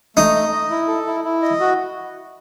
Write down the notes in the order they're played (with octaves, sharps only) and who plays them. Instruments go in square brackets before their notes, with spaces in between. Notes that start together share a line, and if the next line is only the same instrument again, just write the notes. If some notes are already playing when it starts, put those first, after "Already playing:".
[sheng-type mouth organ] A3 [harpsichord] D#4
[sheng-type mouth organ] D#5
D#5
E4
A4
E4
E4
D#5
F#4